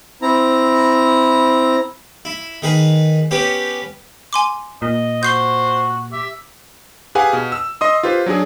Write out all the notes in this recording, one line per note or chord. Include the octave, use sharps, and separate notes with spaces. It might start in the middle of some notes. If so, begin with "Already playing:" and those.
C4 E4 A#5
E4
D#3 G#4 B4
B3 C#4 G4 B4
G#5 C6 D6
A#2 D#5
F#4 C5 G6 C7 G7
G4 E5
G4 G#4 B4 F5 F#5 G#5
B2
E6
D#5 C6 D#6
F4 G4 B4 C5
F#3 D4 G#4